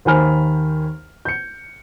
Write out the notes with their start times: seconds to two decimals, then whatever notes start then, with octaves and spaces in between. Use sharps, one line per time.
0.05 D#2 D#3 C5 G#5 B5 F6
1.25 G6 C#7